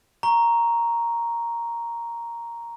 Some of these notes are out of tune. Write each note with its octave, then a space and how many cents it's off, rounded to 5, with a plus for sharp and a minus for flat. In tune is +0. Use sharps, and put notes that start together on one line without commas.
A#5 +0 C#6 +0